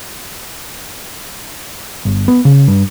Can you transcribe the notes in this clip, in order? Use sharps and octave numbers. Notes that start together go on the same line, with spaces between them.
G1
B3
C#3
G2